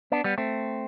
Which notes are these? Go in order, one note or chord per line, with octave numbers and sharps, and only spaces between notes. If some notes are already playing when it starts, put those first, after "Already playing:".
B3 D4
G3 B3
A3 C4